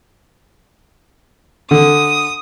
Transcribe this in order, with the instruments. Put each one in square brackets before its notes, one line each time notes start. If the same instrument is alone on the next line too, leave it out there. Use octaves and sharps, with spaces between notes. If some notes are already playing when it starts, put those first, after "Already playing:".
[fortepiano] D3 [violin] D#6